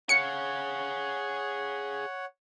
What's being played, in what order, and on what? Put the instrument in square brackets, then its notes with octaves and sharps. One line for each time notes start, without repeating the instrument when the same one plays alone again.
[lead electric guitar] G#4 F5 [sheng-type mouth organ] C#5 F#5 [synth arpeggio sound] C#7